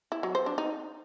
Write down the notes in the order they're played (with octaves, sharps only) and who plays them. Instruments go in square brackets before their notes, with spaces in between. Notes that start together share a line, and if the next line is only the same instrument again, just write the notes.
[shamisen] E4
F#3
C5
D4
D#4